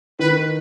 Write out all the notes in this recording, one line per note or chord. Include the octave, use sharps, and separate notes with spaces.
D#3 B4